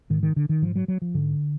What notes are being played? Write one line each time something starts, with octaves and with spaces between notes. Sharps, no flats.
G#2 D#3
D#3
D3
D#3
G#2 F3
F#3
F#3
F3
G#2 D3